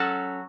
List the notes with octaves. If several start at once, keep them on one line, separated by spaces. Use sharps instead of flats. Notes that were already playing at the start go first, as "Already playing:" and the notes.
Already playing: F#3 C#4 F#4 A4